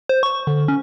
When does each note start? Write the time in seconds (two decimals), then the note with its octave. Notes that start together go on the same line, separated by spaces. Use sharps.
0.09 C5
0.23 C#6
0.47 D3
0.68 C#4